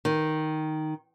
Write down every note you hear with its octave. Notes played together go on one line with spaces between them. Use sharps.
D#3